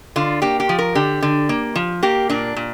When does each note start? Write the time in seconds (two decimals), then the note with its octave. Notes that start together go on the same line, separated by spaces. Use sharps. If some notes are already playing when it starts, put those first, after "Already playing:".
0.16 D3 F4
0.42 A#3 G4
0.60 G4
0.69 F3
0.79 A#4
0.95 D3 G4
1.23 D3
1.49 A#3
1.75 F3
2.03 A#3 G4
2.29 A#2 D4
2.56 A#2